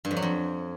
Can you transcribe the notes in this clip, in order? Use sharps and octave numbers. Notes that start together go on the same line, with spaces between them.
G2
F2
F#3
F2